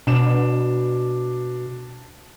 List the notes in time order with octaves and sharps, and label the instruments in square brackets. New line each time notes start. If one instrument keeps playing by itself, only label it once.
[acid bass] B2 [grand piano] D4 E7